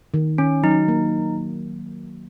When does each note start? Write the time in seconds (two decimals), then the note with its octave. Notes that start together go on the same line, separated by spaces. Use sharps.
0.14 D#3
0.38 D#3 C#4
0.63 F#3 D#4
0.88 A#3